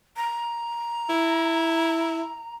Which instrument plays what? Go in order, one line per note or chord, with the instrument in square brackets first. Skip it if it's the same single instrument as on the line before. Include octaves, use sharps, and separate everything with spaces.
[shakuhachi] A#5
[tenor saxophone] E4